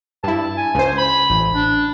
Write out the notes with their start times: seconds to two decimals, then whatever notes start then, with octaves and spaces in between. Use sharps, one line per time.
0.24 G2 E4 A5
0.57 G#5
0.75 C#2 C5
0.98 B5
1.30 A1
1.54 D4